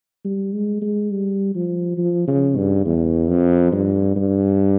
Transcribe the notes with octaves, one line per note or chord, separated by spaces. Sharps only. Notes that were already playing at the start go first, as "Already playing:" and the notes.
G3
G#3
G#3
G3
F3
F3
C#3
G2
E2
F2
G2
G2